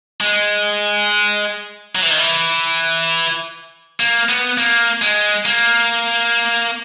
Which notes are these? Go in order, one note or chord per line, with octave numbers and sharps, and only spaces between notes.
G#3
F#3
E3
D#3
E3
A#3
B3
A#3
G#3
A#3